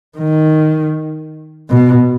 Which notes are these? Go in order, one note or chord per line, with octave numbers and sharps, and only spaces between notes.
D#3
B2